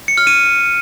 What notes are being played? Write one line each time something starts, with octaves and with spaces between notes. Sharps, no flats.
C#7
F6
D#7